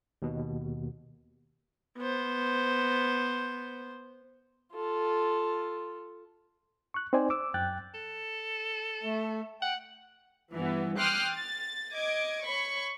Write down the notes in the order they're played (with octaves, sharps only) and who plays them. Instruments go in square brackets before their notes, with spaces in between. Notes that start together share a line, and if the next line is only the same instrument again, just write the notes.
[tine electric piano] D#2 B2
[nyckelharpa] B3 C5
F4 A4
[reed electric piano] C#6 F#6
C4 D#4 C5 D5 G#5
D6 E6
F#2 G5 F#6 A6
[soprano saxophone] A4
[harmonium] A3
[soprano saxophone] F#5 [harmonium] G5
[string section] G2 E3 B3
G5 C6 D6 D#6 F6 F#6
A6
D#5 D6 G#6
C#5 B5 C#6